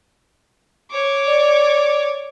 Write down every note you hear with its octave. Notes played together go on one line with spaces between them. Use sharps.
C#5 D6
D5